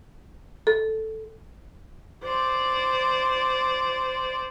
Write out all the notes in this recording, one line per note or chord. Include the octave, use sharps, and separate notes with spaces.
A4
C5 D5